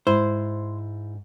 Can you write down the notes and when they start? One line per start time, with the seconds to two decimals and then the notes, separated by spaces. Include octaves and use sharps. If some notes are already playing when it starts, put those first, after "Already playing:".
0.07 G#2 E4 C5